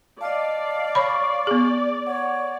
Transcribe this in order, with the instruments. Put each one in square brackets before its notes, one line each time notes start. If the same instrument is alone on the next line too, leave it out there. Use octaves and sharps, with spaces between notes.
[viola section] D5 [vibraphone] D#5 A5 [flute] F5
[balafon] C#5 B5 [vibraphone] C#6
[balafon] B3 G#4
[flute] C#5 [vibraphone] F#5